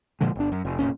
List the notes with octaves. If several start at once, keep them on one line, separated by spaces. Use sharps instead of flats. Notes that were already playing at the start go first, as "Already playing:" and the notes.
A#2 D3 F3 G#3
G1 D4
F#2
F1
F1 B1 A#2 C#4